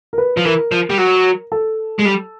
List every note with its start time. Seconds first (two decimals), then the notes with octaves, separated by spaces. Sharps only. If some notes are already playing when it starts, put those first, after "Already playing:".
0.13 A#4
0.18 B4
0.37 F3
0.45 E3 A#4
0.72 F3
0.90 G3
0.98 F#3
1.52 A4
1.99 G#3
2.05 G3